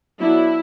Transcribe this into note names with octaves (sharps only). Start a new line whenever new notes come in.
F#3 B3 D4 E4